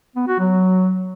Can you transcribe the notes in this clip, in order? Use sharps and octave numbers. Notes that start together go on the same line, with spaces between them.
B3
F#4
F#3